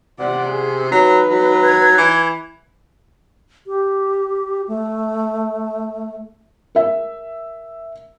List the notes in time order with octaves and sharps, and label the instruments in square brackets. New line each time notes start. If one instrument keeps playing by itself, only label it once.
[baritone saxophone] C3 [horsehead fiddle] D5 F#5
[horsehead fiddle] G#4
[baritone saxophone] F#3 [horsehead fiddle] D#4 B4
[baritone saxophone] F#3
[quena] G#6
[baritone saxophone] E3
[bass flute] G4
A3
[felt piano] A#4 E5